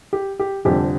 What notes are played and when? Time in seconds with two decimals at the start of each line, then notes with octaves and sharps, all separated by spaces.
0.13 G4
0.39 G4
0.65 F1 F2 D3 G3 G4